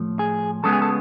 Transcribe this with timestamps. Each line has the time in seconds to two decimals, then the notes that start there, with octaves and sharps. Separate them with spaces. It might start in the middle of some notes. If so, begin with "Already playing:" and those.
Already playing: A2 F3 A3
0.19 G#4
0.63 C#2 C#3 G#3 B3 A4
0.73 G#4
0.82 A4